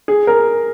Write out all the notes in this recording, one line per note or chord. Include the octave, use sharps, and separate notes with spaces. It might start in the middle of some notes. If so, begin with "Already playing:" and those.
G#4
A#4